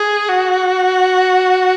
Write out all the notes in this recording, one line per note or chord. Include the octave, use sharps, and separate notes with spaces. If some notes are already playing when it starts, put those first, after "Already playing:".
Already playing: G#4
F#4